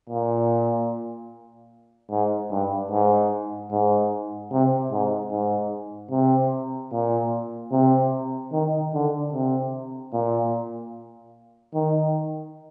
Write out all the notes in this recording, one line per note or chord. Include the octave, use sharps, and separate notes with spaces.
A#2
G#2
G2
G#2
G#2
C3
G#2
G#2
C3
A#2
C3
D#3
D3
C3
A#2
D#3